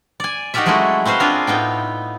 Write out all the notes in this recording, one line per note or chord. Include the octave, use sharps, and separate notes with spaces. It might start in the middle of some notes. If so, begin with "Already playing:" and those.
D5 G#5
D#4 F#4 G4 A#4 D5 E5
F#3 G#3 A3 C#4 E4 F#4
C4 F#4 B4 C5 F5
C4 D4 F4 G#4 A#4
A2 B3 D#4 G5